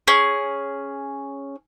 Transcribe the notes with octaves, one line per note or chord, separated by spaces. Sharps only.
C#4 G#4